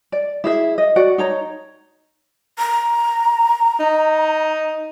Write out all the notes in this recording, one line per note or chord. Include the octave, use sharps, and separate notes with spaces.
D5
E4 G#4 E5
D#5
F#4 D5 F#5
D#4 C#5 A#5
A#5
D#4